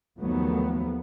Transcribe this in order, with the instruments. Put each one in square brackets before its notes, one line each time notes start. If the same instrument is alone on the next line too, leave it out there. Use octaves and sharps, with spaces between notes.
[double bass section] D#2 D#3 F3 F#3 A3 B3